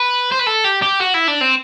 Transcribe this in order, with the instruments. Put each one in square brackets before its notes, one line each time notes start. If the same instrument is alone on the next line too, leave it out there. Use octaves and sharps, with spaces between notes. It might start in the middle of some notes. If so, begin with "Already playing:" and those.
Already playing: [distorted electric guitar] B4
C5
B4
A4
G4
G4
F#4
E4
D4
C4